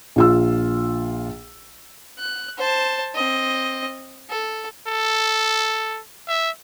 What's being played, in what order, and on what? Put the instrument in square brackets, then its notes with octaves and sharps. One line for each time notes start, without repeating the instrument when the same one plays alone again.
[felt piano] A#1 F4 E6
[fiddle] F#6
C5 A5
C4 D#5
A4
[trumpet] A4
E5